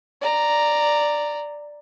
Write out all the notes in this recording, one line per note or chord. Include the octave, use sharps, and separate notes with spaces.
D5 A#5